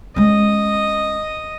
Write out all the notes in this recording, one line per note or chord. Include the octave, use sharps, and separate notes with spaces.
G#3 C#4 D#5